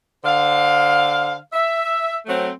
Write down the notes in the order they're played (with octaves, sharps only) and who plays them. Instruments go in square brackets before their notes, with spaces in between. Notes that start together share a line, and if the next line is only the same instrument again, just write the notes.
[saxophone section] D3 C5 F5
E5
F#3 A3 C4